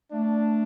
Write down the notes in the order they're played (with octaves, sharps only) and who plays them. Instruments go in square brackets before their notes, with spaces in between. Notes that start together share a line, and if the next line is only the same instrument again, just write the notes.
[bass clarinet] A3 [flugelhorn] D4